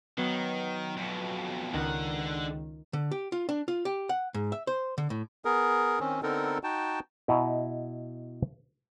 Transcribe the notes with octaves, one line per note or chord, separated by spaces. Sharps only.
D#3 F#3 B3
F2 B2
C#2 D3 D#3 F#5
D3
G4
F4
D4
F4
G4
F#5
G#2
E5
C5
D3
A2
B3 G#4 A#4
D#3 C4 C#4
D3 B3 C4 D#4 A4 A#4
D#4 F#4 G5 A5
B2 E4 D#5 F#5 A#5